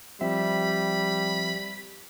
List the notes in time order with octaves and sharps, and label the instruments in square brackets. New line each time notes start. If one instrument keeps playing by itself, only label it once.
[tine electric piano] F3 C4 E5 [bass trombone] G3 [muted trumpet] B5